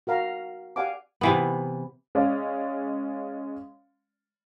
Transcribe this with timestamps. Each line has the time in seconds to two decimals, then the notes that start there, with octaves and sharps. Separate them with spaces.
0.07 F#4 A#4 F5 A#5
0.76 G4 D5 F5 F#5 G#5 D6
1.21 C3 E3 B3
2.15 G#3 C#4 D5 F5